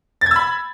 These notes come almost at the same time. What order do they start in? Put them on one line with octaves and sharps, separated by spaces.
A6 G#6 E6 B5